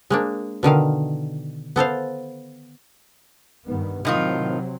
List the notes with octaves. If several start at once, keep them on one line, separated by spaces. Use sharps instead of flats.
G#3 A#3 D4
B2 D3 D#3 F5
B3 A4 C5 F5
G2 D#3 B3
A2 C3 D#3 F#3 C4 F4